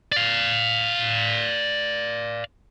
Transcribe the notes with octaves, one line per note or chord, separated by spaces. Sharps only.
D5 F5